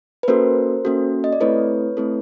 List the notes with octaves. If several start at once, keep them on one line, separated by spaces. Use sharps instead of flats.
B4
A#3 C#4 F#4 A4 A#4 C5
A#3 C#4 F#4 A4
D#5
D5
A3 C4 E4 A4 B4 C#5
A3 C4 E4 A4